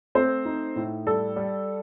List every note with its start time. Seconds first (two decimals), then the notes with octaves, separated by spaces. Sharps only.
0.15 A3 C4 C5
0.45 D#4
0.76 A2
1.07 G3 A4
1.36 G3